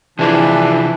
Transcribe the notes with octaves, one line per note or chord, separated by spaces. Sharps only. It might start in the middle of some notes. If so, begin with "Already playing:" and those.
C3 E3 F3 D4 G#4